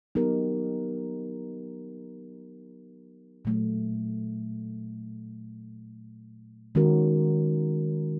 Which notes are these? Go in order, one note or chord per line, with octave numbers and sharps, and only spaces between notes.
F#3 B3 D#4 G4 A#4
A#2 F#3 A3
D#3 G#3 C#4 F#4 A#4